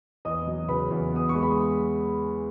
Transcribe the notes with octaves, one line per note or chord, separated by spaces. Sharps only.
E2 D#5 D#6
F#3
C#3 B4 B5
E2
B3 D#6
G#3 C#6
B5